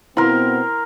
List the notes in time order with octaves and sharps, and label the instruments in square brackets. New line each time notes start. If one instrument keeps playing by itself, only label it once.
[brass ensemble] B2 B3 C4 [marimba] E4 [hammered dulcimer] A#4 C6